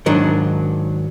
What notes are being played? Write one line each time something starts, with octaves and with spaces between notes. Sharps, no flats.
G#2 D#3 F#3 D4